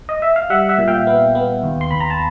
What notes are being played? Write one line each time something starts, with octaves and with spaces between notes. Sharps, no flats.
D#5
E5
F5
G3 E5 F#5
E5 F#5
A#2
F5 G5
B3
B3
D#2
C6
D#2 B5
A#5
A5